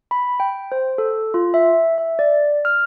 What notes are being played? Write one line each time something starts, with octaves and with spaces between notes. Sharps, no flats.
B5
G5
C5
A4
F4
E5
E5
D5
F6